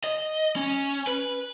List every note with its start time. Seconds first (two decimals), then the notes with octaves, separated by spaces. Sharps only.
0.04 D#5
0.56 C#4
1.07 B4